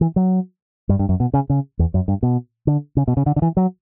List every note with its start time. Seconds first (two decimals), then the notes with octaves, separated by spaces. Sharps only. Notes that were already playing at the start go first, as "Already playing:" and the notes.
0.01 E3
0.16 F#3
0.89 G2
0.99 G2
1.09 F#2
1.20 B2
1.34 C#3
1.50 C#3
1.79 E2
1.94 F#2
2.08 G2
2.23 B2
2.67 D3
2.97 C#3
3.08 B2
3.17 C#3
3.26 D3
3.36 D3
3.42 E3
3.57 F#3